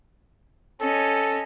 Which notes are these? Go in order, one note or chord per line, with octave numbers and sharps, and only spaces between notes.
C#4 A4 D#5